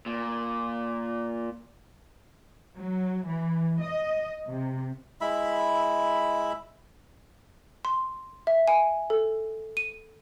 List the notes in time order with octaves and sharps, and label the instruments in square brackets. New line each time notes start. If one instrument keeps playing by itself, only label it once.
[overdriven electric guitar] A#2
[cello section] F#3
E3
D#5
C3
[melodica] G#3 E4 E5 B5
[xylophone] C6
E5
G#5
A4
D#7